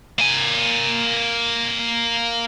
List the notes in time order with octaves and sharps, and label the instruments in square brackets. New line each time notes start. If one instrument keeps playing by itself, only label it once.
[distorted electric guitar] A#3 G#5